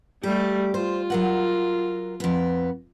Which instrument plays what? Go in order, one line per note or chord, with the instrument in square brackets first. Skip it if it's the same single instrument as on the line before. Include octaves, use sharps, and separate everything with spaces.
[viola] G3 A3 [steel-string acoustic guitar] G4
[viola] F4 [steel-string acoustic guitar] C5
[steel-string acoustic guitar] F#3 A#4 F#5
F2 B3